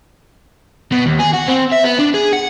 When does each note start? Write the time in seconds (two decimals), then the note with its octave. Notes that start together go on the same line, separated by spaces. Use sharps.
0.92 B2
1.06 D#2
1.19 G#4
1.33 F#4
1.48 C4
1.72 E5
1.84 B3
1.98 D4
2.14 G#4
2.33 F#5